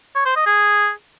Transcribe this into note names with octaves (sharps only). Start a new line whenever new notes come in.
C#5
C5
D#5
G#4